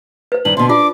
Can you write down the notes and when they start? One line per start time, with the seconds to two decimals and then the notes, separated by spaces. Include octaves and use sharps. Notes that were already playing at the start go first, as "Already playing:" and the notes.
0.32 B4 C5
0.45 G2 D#3 F#7
0.57 B2 D3 C6
0.69 D4 F4 D6